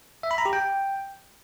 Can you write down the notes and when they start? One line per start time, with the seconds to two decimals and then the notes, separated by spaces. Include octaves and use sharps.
0.23 E5
0.31 B5
0.38 A#5
0.46 G4
0.53 G5